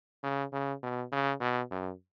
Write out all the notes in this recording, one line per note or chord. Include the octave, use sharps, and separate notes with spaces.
C#3
C#3
B2
C#3
B2
F#2